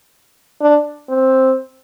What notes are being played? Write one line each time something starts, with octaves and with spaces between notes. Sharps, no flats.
D4
C4